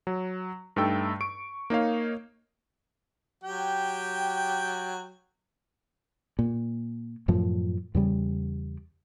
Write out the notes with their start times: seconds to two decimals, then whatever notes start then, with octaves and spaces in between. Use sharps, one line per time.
0.07 F#3
0.76 G2 A3 D#4 A4 G5 E6
1.21 C#6 D7
1.70 A#3 D#4 C#5 F5
3.44 F#3 G4 G5
6.39 A#2
7.28 F#2 A2 F3
7.95 E2 C#3 G3